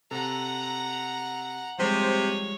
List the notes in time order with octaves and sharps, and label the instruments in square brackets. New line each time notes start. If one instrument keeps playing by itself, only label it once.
[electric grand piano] C3 A4 [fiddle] F#5 A#5
[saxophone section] C3 C5 [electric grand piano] F3 G3 G#3 [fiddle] C#5